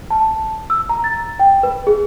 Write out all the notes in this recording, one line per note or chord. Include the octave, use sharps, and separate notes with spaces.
A5
E6
A#5
A6
G5
B4
G#4